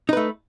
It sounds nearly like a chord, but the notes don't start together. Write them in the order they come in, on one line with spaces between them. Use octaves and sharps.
D#4 B4 A3